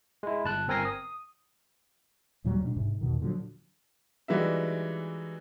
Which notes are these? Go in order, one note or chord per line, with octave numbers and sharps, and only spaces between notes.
G#3 E4
G1 A5 F#6
G1 C4 A#4 G#5 A#6 C7
D#6
D#2 A#2 F#3 G3
B2 G#3 C#4 D4
G#2 C3
E2 B2 D#3
A#2 D3 F3 F#3
E3 G3 G#3 D#4 F#4 E5